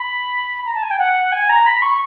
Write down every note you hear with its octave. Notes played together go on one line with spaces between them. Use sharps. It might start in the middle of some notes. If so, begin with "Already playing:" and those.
Already playing: B5
A#5
A5
G#5
G5
F#5
G#5
A#5
B5
C#6